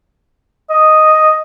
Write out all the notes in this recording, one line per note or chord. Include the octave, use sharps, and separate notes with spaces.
D#5